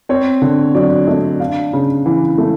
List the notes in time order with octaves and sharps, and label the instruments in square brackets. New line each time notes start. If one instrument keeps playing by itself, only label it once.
[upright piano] C4 C#5
D3
F#3 D5
A3 D#5
D4 F5
C#3
E3
A3